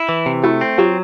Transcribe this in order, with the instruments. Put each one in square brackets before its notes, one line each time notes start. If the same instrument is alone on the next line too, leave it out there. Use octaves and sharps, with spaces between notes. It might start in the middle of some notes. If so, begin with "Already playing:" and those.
Already playing: [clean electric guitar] E4
E3
C3
[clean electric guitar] A3 [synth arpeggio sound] E4 F#4
[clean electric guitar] C4
[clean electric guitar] F#3 [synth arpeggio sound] F4 G4